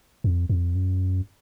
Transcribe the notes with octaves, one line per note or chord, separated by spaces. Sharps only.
F2
F2
F#2